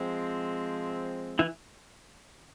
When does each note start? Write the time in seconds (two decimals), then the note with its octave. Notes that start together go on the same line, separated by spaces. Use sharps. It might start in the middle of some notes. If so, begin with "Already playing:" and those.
Already playing: F3 G#3 C4
1.39 E3 E4